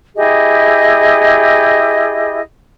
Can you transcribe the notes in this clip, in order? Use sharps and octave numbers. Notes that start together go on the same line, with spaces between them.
E4 G4 G#4 D#5